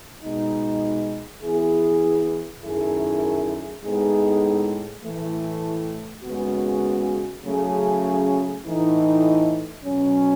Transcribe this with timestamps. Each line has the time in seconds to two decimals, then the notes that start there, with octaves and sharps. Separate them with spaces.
0.23 B2 G#3 D#4
1.43 E3 B3 E4 G#4
2.62 F#2 D#3 A3 E4 G#4
3.82 A2 G#3 B3 D#4 G#4
5.03 A2 E3 A3
6.23 D#2 C#3 G#3 B3 F#4
7.44 C#3 F#3 A3 C#4 G#4
8.64 A2 E3 A3 D#4
9.84 B2 F#3 C#4